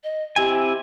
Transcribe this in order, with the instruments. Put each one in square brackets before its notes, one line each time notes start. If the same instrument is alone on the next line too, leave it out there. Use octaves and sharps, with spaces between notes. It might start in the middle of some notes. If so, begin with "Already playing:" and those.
[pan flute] D#5
[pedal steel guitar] C4 E4 G#5 [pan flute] G4